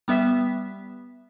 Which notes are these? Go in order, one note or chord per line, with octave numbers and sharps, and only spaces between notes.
G3 B3 E5 B6